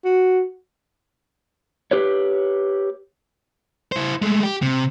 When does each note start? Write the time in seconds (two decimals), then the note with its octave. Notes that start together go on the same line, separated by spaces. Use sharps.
0.04 F#4
1.91 G4 B4 C#5
3.92 E4 C5
4.22 G#3 A3
4.43 G4
4.62 C3